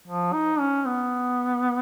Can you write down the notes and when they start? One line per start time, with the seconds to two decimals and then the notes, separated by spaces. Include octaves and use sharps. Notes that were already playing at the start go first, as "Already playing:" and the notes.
0.07 F3
0.33 D#4
0.59 C#4
0.86 B3